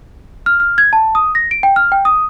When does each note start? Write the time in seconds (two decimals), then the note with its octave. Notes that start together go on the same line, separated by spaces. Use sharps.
0.46 F6
0.60 F6
0.78 G#6
0.93 A5
1.15 D#6
1.35 A#6
1.51 D7
1.63 G5
1.76 F6
1.92 G5
2.05 D#6